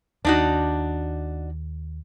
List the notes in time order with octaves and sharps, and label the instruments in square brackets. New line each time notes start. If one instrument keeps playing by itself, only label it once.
[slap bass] D#2 [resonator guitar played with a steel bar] D4 D#4 F#4